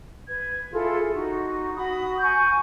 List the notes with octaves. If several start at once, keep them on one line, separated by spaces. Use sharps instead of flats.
B4 G#6
E4 F4 G#4 A4
D#4 F#4
F#4 B5 D#6
G#5 C#6 G6